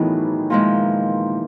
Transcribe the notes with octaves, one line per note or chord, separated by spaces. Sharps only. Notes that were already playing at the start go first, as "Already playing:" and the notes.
Already playing: A2 D#3 E3 F#3 B3 D#4 G#4
A#2 F3 G#3